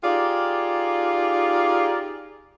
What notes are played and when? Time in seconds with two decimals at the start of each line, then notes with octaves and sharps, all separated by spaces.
0.04 D#4 F4 G4 G#4 D5